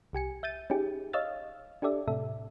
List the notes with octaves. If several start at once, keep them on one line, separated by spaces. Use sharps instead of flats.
C2 G4 G#5 C#7
E5 G6 A6 D#7
C#4 D#4 G4 G#4
C#5 D#5 F5 E6 F6 A6
D4 G4 A4 D5 E5
A2 C3 A4 E5